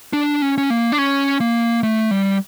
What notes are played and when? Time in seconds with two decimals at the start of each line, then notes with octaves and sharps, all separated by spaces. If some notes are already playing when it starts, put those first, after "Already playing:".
0.13 D4
0.42 C#4
0.58 C#4
0.70 A#3
0.92 D4
0.98 C#4
1.40 A#3
1.83 A3
2.11 G3